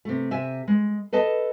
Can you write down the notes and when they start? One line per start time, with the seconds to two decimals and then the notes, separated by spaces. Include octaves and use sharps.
0.05 C3 A3
0.31 C3 E5 G#5
0.68 G#3
1.13 A4 B4 D#5 A5